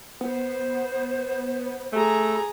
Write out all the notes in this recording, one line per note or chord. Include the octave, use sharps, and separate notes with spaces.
B3 C5
A3 G#4 A#5